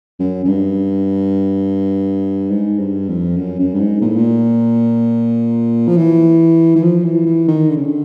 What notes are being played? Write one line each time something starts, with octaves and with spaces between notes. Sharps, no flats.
F#2
F#2
G2
G#2
G2
F2
F#2
F#2
G2
G#2
A#2
A2
A#2
F3
E3
E3
F3
E3
E3
D#3
D3
C#3
D3